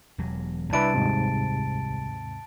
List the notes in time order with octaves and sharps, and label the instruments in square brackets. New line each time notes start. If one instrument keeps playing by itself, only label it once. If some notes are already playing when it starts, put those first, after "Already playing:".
[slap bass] E1 E2 F#3
[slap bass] C2 G3 [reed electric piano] D4 E4 B4 [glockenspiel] A5 A6 D7
[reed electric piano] D#2 G#2 C3